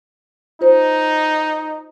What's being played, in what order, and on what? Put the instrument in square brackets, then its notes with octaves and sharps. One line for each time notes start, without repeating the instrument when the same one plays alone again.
[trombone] D#4 [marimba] F4 C5